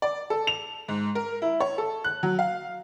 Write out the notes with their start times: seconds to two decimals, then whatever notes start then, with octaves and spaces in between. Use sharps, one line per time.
0.02 D5
0.30 A4
0.47 F7
0.89 G#2
1.15 A#4
1.42 E4
1.60 C#5
1.78 A4
2.04 F#6
2.23 F#3
2.39 F5